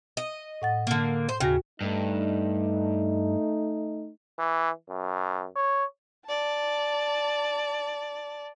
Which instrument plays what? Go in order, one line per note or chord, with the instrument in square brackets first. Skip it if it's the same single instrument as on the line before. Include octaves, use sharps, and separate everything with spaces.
[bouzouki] D#5
[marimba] A2 F#5 A6
[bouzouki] D3 A#3
C5
[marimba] D#2 F#4 A#6 [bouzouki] C#3
[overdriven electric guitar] G2 [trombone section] A3 D#4
[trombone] E3
F#2
C#5
[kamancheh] D5 A5